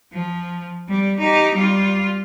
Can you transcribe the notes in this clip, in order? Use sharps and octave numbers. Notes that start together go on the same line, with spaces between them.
F3
G3
D#4 G4
G3 F4